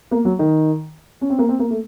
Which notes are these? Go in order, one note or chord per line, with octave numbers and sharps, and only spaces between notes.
A#3
F#3
D#3
C#4
C4
A#3
C4
A#3
A3